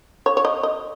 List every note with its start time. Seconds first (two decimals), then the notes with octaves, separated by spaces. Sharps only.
0.26 C#5
0.37 C#5
0.45 D#5
0.63 D#5